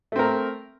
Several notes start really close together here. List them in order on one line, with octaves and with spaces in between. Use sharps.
A3 C4 A#4